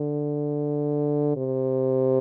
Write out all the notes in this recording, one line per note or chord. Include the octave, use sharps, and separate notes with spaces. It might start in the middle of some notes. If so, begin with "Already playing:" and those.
Already playing: D3
C3